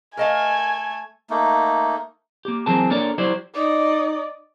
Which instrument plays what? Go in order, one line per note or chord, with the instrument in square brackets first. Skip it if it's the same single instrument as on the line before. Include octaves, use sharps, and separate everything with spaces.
[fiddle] A3 [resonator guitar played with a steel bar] A#4 D#5 F5 [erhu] G#5
[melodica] A3 A#3 D#4
[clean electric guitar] A#3 G4
E3 F#3 C4 G#4 A#4 A5
A#3 D4 A4 A#4 C#5 D5
F#3 E4 G4 C5 D5
[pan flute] D#4 [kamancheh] D5 D#5